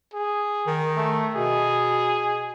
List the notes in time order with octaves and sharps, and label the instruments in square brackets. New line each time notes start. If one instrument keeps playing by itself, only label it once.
[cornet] G#4
[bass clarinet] D#3
[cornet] A3
[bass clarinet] B2 [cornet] G#4